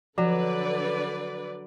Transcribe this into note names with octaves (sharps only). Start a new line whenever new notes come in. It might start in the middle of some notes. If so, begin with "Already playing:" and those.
D3 F3 F#3 B4 D5